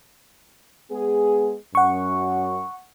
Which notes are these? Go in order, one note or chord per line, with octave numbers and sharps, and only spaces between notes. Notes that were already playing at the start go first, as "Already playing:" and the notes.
G#3 B3 G#4
F#2 F#5 C#6